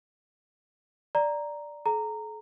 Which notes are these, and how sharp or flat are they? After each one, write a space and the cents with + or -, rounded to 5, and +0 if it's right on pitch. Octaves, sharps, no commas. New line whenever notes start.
D5 +0 A#5 +0
A4 -45 A#5 -15